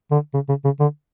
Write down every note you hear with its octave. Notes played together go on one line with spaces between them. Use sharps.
D3
C#3
C#3
C#3
D3